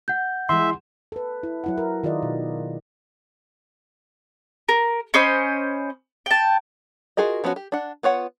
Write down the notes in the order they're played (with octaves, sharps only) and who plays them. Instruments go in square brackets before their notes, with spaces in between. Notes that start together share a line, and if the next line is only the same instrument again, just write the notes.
[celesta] F#5 G6
[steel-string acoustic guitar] E3 G#3 [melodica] E5 [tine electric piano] C6
[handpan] A4 B4
E4
F#3 E4 F#5
A#4
D#3 F4 G#4 D5 D#5
B2
[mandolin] A#4
C#4 C5 D#5 B5
G5 A5
[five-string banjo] F4 F#4 G#4 A#4 D#5
F3 B3 C#4 D#4 F#4
G4
D4 F#5
B3 F4 C#5 F#5